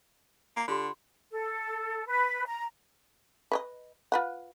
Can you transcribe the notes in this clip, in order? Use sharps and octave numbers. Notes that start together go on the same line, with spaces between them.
A#3
D3 F4 G4 C6
A4
B4
A#5
B4 C#5 D#5
F4 B4 F#5